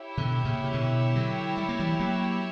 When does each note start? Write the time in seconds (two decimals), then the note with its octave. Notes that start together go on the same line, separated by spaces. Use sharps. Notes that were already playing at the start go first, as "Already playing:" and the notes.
Already playing: E4 G4 C#5
0.17 B2 D3
0.45 A#2 C#3
0.64 C#3
0.73 B2 D3
1.15 D3 F#3
1.57 G3
1.69 A#3
1.79 E3 G3
1.99 F#3 A#3